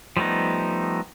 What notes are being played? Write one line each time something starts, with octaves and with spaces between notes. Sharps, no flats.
F3 G3 A3 B3 D#4